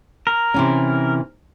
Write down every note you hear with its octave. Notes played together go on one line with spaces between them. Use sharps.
A#4
C3 E3 C#4